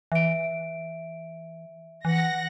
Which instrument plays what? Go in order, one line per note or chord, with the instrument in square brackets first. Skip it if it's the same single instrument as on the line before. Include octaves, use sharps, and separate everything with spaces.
[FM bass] E3 [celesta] E5 D7
[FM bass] E3 [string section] F#5 A#6